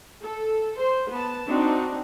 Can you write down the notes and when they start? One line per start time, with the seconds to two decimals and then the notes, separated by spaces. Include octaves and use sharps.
0.22 A4
0.79 C5
1.10 B3 A5
1.48 C4 D4 D#4 F#4